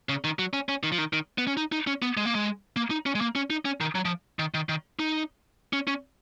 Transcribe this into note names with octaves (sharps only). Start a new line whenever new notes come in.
C#3
D#3
F#3
C#4
C#4
D#3
F3
D#3
D#3
B3
C#4
D#4
D#4
C#4
B3
G#3
A#3
G#3
A#3
D#4
C#4
G#3
A#3
C#4
D#4
C#4
D#3
F#3
F3
D#3
D#3
D#3
D#4
C#4
C#4